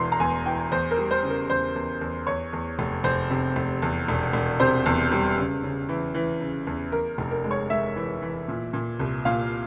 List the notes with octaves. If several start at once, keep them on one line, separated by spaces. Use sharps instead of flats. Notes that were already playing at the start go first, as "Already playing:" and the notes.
Already playing: E1 E2 E3 C6
A#5
E2 G#5
E3 G5
E2 C5
A#4
G3
C5
C#3
A#4
E2 C5
E2
E2
E2 C#5
E2
F1
F1 C5
C3
F1
E2
E1
E1
C3 C5
E2
G3
C#3
C#3
E3
E3
C#3
E2
E2 A#4
F1
A#4
G#3
C#5
G#3 E5
E3
E3
A#2
A#2
C2
A#2 F5